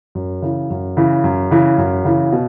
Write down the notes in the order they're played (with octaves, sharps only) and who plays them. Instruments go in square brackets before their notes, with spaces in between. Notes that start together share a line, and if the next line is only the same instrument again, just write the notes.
[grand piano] F#2
C#3 E3
F#2
C#3 E3
F#2
C#3 E3
F#2
C#3 E3
B2